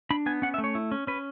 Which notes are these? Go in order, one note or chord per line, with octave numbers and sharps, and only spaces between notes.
D4 B5
B3 G#5
C#4 F#5
E5
A3
C#5
E4
C#4
C#4 B4